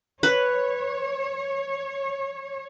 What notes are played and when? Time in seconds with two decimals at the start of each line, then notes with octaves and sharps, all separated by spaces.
0.23 B4 C#5